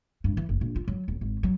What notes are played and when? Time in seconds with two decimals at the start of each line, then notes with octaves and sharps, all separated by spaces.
0.24 G2
0.37 E3
0.49 F#1
0.61 A#1
0.76 F4
0.88 F#3
1.08 D#1
1.21 G#1
1.43 F#3